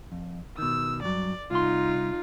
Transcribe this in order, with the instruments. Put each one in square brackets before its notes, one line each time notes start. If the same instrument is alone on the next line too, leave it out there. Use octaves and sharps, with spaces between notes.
[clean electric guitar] F2
[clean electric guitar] B2 D#3 [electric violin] E6
[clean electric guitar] G2 F#3 [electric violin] D5
[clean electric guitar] C2 C6 [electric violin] D#4 F4